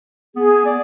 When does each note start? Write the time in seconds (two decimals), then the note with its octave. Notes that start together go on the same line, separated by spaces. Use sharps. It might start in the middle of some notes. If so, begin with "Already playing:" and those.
0.36 B3 G#4
0.65 D5